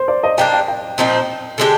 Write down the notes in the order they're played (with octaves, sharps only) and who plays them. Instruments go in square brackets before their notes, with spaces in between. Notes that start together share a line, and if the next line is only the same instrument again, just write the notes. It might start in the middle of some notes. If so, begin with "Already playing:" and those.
Already playing: [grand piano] C5
D5
D#5
[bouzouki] G3 A#3 D4 [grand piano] G5
[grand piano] G5
G5
[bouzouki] A#2 F3 C4 D#4
D3 G#3 D4 G4